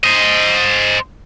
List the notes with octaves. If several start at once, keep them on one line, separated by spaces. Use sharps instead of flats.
C5 D#5